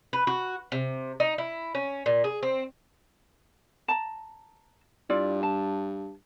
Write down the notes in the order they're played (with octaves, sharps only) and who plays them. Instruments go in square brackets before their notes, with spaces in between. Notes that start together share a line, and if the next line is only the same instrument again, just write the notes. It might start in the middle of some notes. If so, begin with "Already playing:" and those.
[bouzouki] B4
F#4
C3
D#4
E4
C#4
A#2
G#4
C4
[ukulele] A5 A#5
[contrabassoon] G2 [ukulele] E4 F4 D5
[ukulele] A5